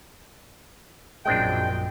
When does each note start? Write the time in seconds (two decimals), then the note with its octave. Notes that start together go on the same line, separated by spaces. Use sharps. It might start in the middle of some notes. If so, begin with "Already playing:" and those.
1.26 A#1 F#2 G#3 C4 D4 G5